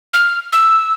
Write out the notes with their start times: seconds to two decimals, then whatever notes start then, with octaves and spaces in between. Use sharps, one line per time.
0.13 F6
0.52 E6